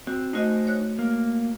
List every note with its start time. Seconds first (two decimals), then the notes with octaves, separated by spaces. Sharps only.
0.07 C4 F#4
0.33 A3 D#4 F#4 C5 D#5
0.67 C#5 F#6
0.99 A#3